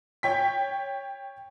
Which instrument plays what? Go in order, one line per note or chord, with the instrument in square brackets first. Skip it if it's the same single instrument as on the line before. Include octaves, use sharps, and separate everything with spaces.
[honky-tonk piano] C#5 G5 B6